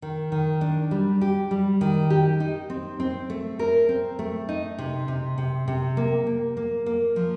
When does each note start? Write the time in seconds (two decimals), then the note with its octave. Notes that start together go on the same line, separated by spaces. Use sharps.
0.02 D#3
0.32 D#3
0.61 D4
0.91 G3
1.21 G4
1.51 G3
1.81 D#3
2.10 G4
2.40 D#4
2.70 C4
3.00 C4
3.30 A3
3.59 A#4
3.89 C4
4.19 A3
4.49 D#4
4.78 C3
5.08 C3
5.38 C3
5.68 C3
5.97 A#3
6.27 A#3
6.57 A#3
6.86 A#3
7.16 F3